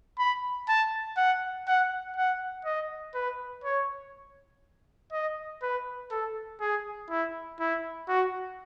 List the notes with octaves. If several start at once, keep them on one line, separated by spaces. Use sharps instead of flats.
B5
A5
F#5
F#5
F#5
D#5
B4
C#5
D#5
B4
A4
G#4
E4
E4
F#4